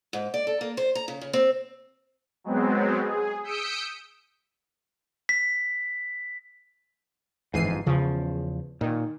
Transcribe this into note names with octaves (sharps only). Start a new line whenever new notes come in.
G#2
D5
A4
A#3
C5
A#5
C#3
C#3
C4
F#3 G#3 B3 C4
G#4
D#6 E6 G6 B6 C#7 D7
B6
G1 F2 G#2 E3 C7 D#7
E2 C#3 F3
A#2 D#3